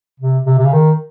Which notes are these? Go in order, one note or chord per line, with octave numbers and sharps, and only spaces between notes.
C3
C3
C3
C#3
D#3